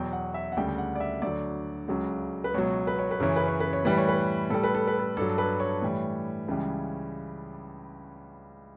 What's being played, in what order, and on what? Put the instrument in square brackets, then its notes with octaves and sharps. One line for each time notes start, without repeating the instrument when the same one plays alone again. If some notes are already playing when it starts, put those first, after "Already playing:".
Already playing: [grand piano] E2 B2 F#3 G5
F#5
E5
F#5
D2 C#3 G3 G5
G5
F#5
D5
E5
D2 D3 F#3 D5
C#2 C#3 F#3
B4
C#2 B2 F#3 C#5
B4
C#5
B4
F#2 C#3 E3 C#5
B4
C#5
B4
C#5
A2 E3 G3 B4
C#5
B4
A2 G3 A4
B4
A4
B4
A4
G2 F#3 A4
B4
C#5
A2 E3 G3
C#2 C#3 E3 G3